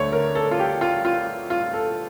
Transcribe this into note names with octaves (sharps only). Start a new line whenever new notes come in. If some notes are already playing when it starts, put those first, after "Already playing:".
Already playing: D2 D3 A3 C#5 D5
A#4
A4
F4
G4
F4
F4
F4
A4